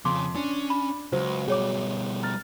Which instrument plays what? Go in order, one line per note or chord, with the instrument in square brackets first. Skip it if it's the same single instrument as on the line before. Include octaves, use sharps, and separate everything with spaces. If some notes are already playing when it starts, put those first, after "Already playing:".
[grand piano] F2 [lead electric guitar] C#3 [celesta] C6 D6
[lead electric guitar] C#4 [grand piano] D4
[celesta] B5
[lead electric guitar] C#2 [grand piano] F#3 [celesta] C5
[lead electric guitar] B2 G3 [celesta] G#4 C#5 D6
[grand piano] A#5 F6 A6